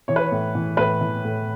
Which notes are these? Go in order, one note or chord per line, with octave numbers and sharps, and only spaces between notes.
E3 C#5
B4
C#5
A2
E3
A2 B4
E3
A2